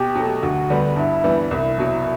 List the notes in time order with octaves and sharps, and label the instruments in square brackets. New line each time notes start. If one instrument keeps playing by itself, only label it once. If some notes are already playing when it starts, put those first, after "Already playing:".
Already playing: [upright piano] B2 [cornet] G4
[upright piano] F#3 A3
[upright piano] D2 [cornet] F#4
[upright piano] D3 G3 B3
[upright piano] G2 [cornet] E4
[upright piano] E3 G3 B3
[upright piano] C2 [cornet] E4
[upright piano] B2 F#3